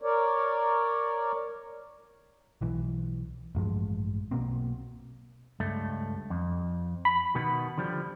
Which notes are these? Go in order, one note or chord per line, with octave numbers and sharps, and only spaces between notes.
A#4 C#5 D5
B1 E3
A1 G2 F3 G#3
B1 B2 A#3 C4
C#2 G2 A3
F2
B5
B2 D#3 B3
D3 F3 G3